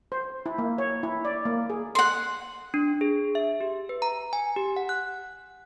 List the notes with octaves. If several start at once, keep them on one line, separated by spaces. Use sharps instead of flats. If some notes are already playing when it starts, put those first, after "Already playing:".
C5
E4
A#3
C#5
E4
D5
A#3
G#4
F#5 C6
D4
G#4
E5
G4
B4
A#5
G#5
G4
F#5
F#6